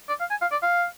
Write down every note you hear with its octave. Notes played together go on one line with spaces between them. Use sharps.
D5
F5
G#5
F5
D5
F5